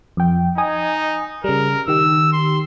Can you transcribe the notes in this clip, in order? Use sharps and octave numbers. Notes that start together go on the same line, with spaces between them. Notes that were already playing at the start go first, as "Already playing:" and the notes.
F2 G5
D#4 D#5 G#5 D#6
C#3 G3 A#4
D#3 G4 E6
C6